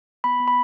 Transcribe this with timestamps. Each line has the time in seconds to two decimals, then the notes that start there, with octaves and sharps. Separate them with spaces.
0.24 B3 B5
0.40 B3
0.48 B5